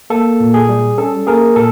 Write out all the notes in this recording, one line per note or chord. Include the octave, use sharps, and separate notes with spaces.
A#3 A4
A#2
G#4
G3
C#4 A4
A#3 G#4 A#4
A#2 A4